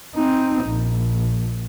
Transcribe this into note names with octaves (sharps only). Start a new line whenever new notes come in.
C4 D#4
A#1